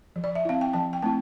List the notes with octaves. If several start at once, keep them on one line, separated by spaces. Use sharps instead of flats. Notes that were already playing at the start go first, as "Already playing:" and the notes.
F3
D5
E5
C4 E4 F5
G5
F3 A5
G5
A3 C4 E4 A5